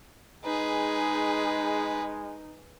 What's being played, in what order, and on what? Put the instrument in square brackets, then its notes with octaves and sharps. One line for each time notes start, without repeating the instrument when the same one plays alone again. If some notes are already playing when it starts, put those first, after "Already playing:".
[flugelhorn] G#3 [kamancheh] D#4 [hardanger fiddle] G#4 B4